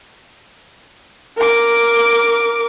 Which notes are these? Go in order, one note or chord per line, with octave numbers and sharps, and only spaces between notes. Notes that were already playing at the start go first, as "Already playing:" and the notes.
A#4 D6